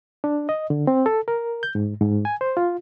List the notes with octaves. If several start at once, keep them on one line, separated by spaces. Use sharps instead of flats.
D4
D#5
D3
C4
A4
A#4
G6
G#2
G#2
G#5
C5
F4